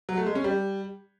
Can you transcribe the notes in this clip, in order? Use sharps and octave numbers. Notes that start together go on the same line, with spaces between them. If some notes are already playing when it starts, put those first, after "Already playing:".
F#3
A3
G#3
C#4
G3